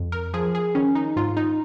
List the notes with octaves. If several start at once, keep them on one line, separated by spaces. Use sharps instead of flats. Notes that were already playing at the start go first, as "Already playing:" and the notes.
Already playing: F2
A#4
F3 G#4
G#4
D#3 C#4
D#4
G#2 F4
D#4